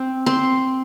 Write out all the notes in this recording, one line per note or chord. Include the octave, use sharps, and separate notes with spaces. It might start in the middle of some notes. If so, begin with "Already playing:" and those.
Already playing: C4
C4 C6